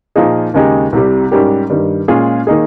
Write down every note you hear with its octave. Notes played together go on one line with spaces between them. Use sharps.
A#2 F3 A#3 D#4 G#4
D#2 C#3 G#3 D#4 G4
C2 C3 G3
G#2 G3 C#4 G4 A#4
G2 D#3 G3
A#2 G#3 C#4 F4 G#4
D#3 A#3 D#4 G#4